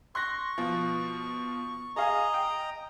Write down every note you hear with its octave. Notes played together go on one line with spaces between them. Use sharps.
C6 C#6 F#6 A#6
B2 F3
G#4 D#5 F5 G#5 A#5
G5